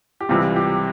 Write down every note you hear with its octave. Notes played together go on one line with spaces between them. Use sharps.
G4
C#2 C3 E3 G3 C4 F4
G4